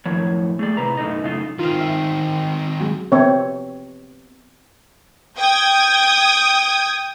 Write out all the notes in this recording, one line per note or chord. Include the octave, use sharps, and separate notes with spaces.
F#2 A2 F3 C#5
A3 G#4 D5
A2 C3 B4 A#5
F#2 B2 A3 D#4 D#5
F#2 C#3 A3 D#4 F4
D#3 C4 F4 F5
E5
F#3 G#3
B3 C4 C#5
G5 D#6 G#6